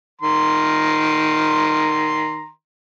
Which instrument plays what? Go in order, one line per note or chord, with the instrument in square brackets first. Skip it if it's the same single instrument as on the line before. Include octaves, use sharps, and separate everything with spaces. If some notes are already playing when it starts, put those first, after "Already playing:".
[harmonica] D#3 A#5 C6